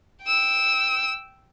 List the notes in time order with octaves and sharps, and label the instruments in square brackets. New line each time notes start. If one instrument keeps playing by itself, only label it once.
[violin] G5 E6